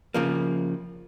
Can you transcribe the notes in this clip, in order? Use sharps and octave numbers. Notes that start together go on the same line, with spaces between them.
C#3 F3 A#3